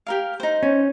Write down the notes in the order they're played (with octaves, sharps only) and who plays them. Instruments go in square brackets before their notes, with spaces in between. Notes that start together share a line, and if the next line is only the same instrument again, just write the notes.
[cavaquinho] G4 A#4 F5
D#4 C5
[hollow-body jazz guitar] C#4